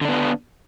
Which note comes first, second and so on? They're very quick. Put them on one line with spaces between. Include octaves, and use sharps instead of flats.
D3 D4 B3